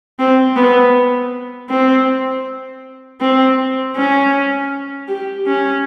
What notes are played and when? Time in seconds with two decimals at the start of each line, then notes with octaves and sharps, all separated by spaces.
0.19 C4
0.56 B3
1.69 C4
3.21 C4
3.96 C#4
5.08 G4
5.47 C#4